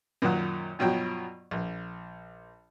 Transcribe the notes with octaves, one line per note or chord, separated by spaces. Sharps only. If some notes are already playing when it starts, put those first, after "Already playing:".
F#2 A#2 D#3 F#5
G2 B2 F3 F#3 G5
A#1